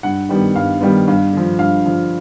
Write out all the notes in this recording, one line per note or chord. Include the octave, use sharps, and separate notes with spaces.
G2 F#5
D#3 G3 B3
G2 F5
D#3 G3 B3
G2 F5
D3 F3
G2 F5
D3 F3